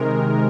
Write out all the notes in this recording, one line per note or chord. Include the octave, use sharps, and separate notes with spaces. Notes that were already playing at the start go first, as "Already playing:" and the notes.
Already playing: C3 D#3 G#3 A#4